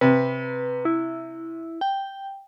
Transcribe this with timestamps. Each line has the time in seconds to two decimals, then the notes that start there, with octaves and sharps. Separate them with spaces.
0.01 C3 B4
0.85 E4
1.81 G5